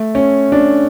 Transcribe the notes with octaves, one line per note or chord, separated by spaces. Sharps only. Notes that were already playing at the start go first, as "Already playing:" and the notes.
Already playing: A3
C#4
D4